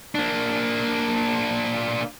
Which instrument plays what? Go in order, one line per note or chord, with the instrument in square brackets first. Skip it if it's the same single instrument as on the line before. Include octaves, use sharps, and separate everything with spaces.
[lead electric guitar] A#3 D4